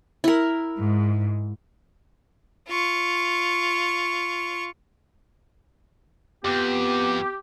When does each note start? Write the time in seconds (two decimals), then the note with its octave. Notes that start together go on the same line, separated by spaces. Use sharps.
0.24 E4 A#4
0.77 G#2
2.69 F4 C#6
6.45 F2 B3 G4